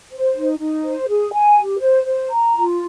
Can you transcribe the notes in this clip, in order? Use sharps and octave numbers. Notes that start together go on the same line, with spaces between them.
C5
D#4
D#4
C5
G#4
G#5
G4
C5
C5
A#5
F4